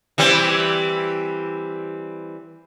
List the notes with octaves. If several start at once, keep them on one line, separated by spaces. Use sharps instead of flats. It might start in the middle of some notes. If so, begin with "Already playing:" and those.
E3 G3 C4